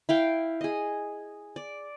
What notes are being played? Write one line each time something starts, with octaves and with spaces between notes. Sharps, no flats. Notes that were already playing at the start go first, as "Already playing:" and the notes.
E4 F5 G5
G#4 D#5
D5